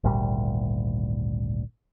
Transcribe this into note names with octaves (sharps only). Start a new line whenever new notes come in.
G#1 D2 A#2 G3